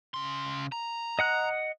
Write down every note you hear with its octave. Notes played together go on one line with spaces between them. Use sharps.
C#3 C6
A#5
D#5 F#5 F#6